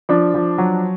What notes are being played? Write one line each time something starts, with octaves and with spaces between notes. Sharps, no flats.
F3 D4
F3
F#3